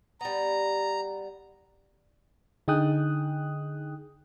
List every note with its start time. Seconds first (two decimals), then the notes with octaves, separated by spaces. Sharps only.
0.21 G3 B3 A#5
2.68 D3 D#4 G#4 G5 D#6 F#6